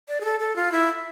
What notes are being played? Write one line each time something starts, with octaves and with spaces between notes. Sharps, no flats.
D5
G#4
A4
A4
F4
E4